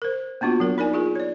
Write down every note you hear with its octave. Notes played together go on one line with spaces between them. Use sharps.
A#4 C5
A#3 B3 D4 F4 F#4
F#3 A#4
D#4 A#4 D5 G#5
F4 G#4 A#4
C#5 D5